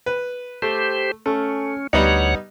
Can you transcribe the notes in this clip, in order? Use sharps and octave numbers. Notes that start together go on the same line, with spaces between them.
B4
A3 G4 C5
A3 C#4
D2 G3 B3 D#4 C#5 F#5